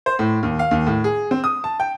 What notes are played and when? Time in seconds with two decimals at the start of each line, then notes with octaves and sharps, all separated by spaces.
0.06 C5
0.19 A2
0.43 D#2
0.59 F5
0.71 D#2
0.87 A2
1.04 G#4
1.31 C4
1.44 D#6
1.64 A5
1.80 G5